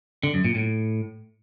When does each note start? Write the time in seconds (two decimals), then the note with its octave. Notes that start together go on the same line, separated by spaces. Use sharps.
0.23 D3
0.34 F#2
0.44 A#2
0.55 A2